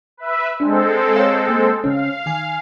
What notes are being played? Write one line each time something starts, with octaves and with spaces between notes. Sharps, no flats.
B4 E5
G#3 C4 D4 A4
A#4 C#5 F5
A#3
C#3 C#4 F5
D#3 G#5